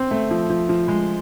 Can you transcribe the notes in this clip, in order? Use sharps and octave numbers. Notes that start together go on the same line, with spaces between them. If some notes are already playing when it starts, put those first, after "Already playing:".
Already playing: C4
A3
F3
F3
F3
G#3